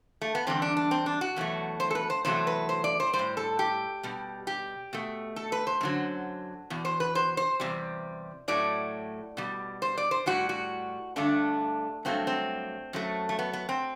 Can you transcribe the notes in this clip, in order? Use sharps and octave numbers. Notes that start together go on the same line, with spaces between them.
A3
B3
E2 D3 G3 C4
D4
D4
C4
D4
F#4
E2 B2 F#3 A3
C5
A4
B4
C5
E2 C3 F#3 A3 C5
B4
C5
D5
C5
G3 C5
A2
A4
G4
B2 G3
G4
B2 A3
A4
B4
C5
F#2 D3 F#3
E2 B2
C5
B4
C5
C5
E2 C3 G3
A2 F#3 A3 D5
B2 G3
C5
D5
C5
A2 G3 F#4
F#4
G2 D3 A3 D4
G2 F#3 A3 C4
C4
F#2 F#3 A3
A3
B3
B3
C4